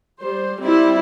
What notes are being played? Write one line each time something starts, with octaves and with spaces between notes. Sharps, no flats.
G3 C5
G3 C4 E4